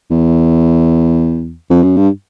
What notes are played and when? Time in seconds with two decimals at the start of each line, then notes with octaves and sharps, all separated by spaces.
0.11 E2
1.70 F2
1.83 F#2
1.97 G2